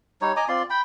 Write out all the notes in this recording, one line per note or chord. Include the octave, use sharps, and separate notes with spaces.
G3 D#4 C#5
D#5 G#5 A#5 D6
C4 F4 D5 C6
G5 B5